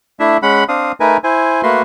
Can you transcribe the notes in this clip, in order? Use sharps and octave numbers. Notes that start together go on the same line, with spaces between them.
A3 D4 E4 E5
G#3 C#4 F#5 B5
C4 D4 F5 D#6
A3 D#4 A#4 B4 G#5
E4 C5 G#5
A3 A#3 F#4 B4 C6